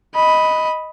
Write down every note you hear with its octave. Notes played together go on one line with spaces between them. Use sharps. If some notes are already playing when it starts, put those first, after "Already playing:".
D#5 B5